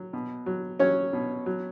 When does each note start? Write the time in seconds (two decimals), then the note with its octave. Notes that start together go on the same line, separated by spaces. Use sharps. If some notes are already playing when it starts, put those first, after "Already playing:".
Already playing: F#3
0.13 B2
0.46 F#3
0.80 F#3 C#4 C#5
1.13 B2
1.46 F#3